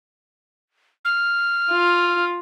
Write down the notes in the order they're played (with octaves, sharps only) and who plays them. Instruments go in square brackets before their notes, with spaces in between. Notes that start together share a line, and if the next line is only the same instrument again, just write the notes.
[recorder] F6
[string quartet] F4